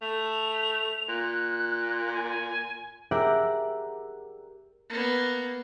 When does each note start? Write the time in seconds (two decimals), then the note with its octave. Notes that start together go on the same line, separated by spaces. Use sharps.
0.02 A3 F7
1.09 A#2 F#6
2.12 G#5
3.11 G4 G#4 A#4 D5 E5 F#5
4.90 A#3 B3